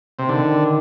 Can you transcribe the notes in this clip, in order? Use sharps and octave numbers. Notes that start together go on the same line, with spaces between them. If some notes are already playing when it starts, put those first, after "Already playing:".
C3
D3 D#3